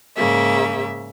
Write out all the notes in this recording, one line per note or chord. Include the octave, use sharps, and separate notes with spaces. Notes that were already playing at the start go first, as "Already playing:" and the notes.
G#2 C#3 A#3 E5